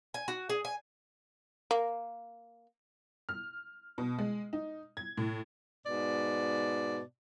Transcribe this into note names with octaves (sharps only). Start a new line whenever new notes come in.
G#5
F#4
G#4
G#5
A#3
F6
B2
G#3
D#4
G#6
A2
G#2 B2 D5